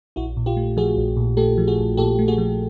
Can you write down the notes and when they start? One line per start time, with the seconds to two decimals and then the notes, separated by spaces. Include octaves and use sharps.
0.16 A#1 E4 F#4
0.37 A#2
0.46 F4 G4
0.57 A3
0.77 F3 F#4 G#4
0.97 A#1
1.17 A#2
1.37 A3 G4 A4
1.58 F3
1.67 F#4 G#4
1.78 A#1
1.97 A#2 G4 A4
2.19 A3
2.28 F#4 G#4
2.38 F3